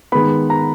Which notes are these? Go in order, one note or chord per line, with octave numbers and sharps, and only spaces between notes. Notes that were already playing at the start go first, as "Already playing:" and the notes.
D#3 G#3 B3 B5
A#5